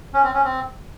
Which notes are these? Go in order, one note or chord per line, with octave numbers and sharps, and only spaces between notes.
C#4
C4
C#4
C4